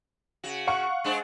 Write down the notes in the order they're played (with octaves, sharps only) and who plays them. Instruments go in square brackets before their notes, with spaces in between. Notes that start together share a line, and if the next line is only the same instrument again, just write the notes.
[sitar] C#3 F#4
[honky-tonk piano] F5 F#5 C#6
[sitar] G#3 D4 C5